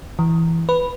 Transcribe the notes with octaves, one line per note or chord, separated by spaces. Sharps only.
E3
B4